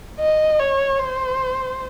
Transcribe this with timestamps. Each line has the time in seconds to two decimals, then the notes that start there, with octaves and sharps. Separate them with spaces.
0.19 D#5
0.60 C#5
0.99 C5